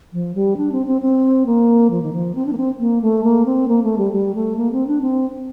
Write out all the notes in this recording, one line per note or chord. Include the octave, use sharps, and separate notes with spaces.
F3
G3
D4
C4
C4
C4
A#3
F3
D#3
F3
C4
D4
A#3
C4
A#3
A3
A#3
C4
A#3
A3
G3
G3
A3
A#3
C4
D4
C4